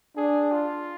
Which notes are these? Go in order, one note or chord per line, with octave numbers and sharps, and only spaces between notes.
D4 G#4
F4